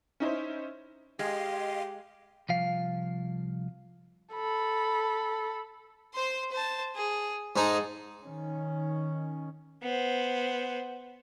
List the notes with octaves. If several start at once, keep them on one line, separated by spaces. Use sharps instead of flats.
C#4 D#4 E4 C5
G#3 G4 D#5 F5 C6
C2 F3 F5
A4 B5
C5 C6
C5 A5
G#4
G#2 D#4 G#4 A4
D#3 C#4
B3 C5